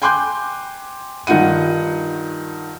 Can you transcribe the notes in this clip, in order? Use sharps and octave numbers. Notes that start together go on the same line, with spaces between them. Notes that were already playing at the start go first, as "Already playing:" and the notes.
G5 G#5 C6 D6 F#6 G6
G2 D#3 D#4 F4 F#5 D#7